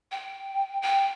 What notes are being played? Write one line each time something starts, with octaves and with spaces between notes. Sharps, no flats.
G5
G5